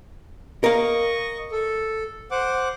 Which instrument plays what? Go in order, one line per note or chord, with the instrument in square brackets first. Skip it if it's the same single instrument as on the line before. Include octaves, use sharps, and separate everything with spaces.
[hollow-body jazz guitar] A#4 F5 [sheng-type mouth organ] D#5 C#6
[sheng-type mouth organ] A4
C5 F#5 D6